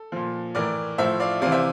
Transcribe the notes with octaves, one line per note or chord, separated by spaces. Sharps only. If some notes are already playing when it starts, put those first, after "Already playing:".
Already playing: A4
A#2 F3
A2 E3 A#4 D5
A2 F3 C5 E5
D5 F5
C3 E3 D5 F5
C5 E5